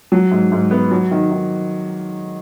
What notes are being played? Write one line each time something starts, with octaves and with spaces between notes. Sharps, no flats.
F#3
G#2
G#2
B3
F#3
D#3
D#3